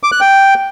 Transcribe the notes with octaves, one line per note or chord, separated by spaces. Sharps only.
D6
F#6
G5